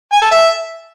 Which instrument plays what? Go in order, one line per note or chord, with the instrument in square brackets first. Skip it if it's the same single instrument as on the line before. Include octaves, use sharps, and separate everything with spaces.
[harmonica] G#5
A4
E5